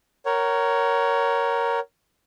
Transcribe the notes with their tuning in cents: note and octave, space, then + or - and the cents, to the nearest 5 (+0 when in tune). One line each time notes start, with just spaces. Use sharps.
A#4 +0 C#5 +5 F#5 +35